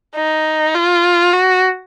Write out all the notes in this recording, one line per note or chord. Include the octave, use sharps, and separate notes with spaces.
D#4
F4
F#4